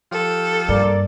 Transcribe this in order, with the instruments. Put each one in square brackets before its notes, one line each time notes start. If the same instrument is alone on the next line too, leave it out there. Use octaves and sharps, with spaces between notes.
[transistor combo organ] F3 F4 G4 [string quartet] A4
[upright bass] G2 [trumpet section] A#3 D5